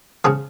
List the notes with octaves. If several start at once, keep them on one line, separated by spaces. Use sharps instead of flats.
C#3 F3 G#4